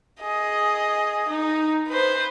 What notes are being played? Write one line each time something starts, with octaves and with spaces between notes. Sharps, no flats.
G#4 D#5
D#4
B4 C5